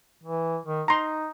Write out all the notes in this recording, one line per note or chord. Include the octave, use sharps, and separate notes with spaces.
E3
D#3
D#4 A#5 C6